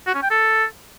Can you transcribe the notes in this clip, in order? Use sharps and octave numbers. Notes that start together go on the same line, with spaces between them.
F#4
C#4
G5
A4